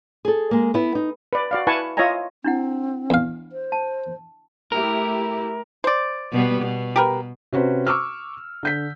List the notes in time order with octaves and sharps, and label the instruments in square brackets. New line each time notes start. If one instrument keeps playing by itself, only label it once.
[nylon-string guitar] G#4 A4
G#3 A#3
B3 E4
D#4
[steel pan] B4 D5
F#4 D5 F5
E4 B4 F#5 G#5 A5 C#6
F4 C#5 D#5 E5 G#5 A#5
[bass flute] C4 [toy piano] D4 E4 F#5
[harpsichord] E2 F5
[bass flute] C5
[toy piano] A5
[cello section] A3 E4 G4 [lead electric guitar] A#4
[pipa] C5 D5
[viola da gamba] B2 G3 B3
B2
[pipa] G4 A#4 B4
[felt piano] C3 C#4 F#4 B4 C5
C#6 D6 E6 F6
D3 G6 B6